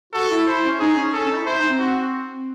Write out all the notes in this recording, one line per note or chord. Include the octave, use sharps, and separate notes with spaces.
F#4 A4
E4
E4 C5
C#4
D#4 G#4
C#4
C#4 A4
C#4
D#4
E4
E4 C5
D#4
C4
F#4